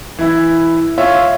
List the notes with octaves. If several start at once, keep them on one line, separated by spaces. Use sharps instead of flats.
E3 E4
F4 C#5 E5